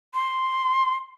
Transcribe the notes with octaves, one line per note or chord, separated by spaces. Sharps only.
C6